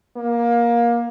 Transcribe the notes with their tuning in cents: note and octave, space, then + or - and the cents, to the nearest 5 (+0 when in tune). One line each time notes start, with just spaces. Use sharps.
A#3 +20